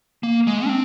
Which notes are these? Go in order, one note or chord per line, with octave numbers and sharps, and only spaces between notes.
A#3
G#3
D4
C4